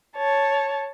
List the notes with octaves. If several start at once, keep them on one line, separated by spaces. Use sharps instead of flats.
C#5 A5